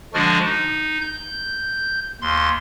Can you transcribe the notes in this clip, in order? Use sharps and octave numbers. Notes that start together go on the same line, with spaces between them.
D3 F3 G#3 D4 F#4 F6
D#4
G6
D#2 C6